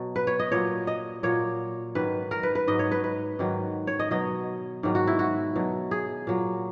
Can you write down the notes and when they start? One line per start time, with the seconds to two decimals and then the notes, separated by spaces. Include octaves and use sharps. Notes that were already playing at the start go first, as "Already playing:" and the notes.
Already playing: B2 F#3
0.16 B4
0.27 C#5
0.39 D#5
0.52 A#2 F#3 C#5
0.87 D#5
1.23 A#2 F#3 C#5
1.95 G#2 D#3 F#3 B4
2.31 A#4
2.43 B4
2.55 B4
2.67 G#2 F#3 D#5
2.79 C#5
2.91 B4
3.04 B4
3.39 G#2 D#3 F#3
3.87 C#5
4.00 D#5
4.11 B2 F#3 D#5
4.83 G#2 D#3 F#3
4.95 F#4
5.07 E4
5.19 F#4
5.55 B2 F#3
5.91 G#4
6.27 A#2 F#3